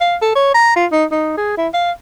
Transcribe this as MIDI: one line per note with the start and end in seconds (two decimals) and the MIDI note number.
0.01 0.16 77
0.21 0.31 69
0.35 0.50 73
0.54 0.75 82
0.76 0.86 65
0.92 1.05 63
1.11 1.34 63
1.37 1.54 68
1.57 1.67 64
1.73 1.91 77